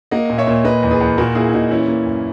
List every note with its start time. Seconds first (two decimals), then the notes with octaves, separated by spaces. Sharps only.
0.11 A#3 D#5 F#5
0.30 A#2
0.38 C#5 E5
0.47 A#2
0.65 A#3 B4 D#5
0.83 E2
0.91 G#4 B4
1.01 E2
1.17 A#2 F#4 A#4
1.35 A#3 E4 G#4
1.49 E4
1.53 A#2 D#4 F#4
1.71 E3 C#4 E4
1.88 A#3
2.06 F#2